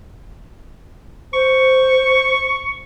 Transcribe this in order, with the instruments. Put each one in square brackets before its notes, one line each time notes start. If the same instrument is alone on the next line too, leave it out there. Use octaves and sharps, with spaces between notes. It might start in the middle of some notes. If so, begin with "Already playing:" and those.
[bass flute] C5 [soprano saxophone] C#6